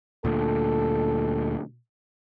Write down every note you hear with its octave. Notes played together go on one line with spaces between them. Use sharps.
D2 A#2 A4